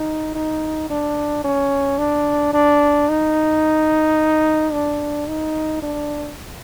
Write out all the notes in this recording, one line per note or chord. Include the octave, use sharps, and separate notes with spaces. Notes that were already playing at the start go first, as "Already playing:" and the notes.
Already playing: D#4
D#4
D4
C#4
D4
D4
D#4
D4
D#4
D4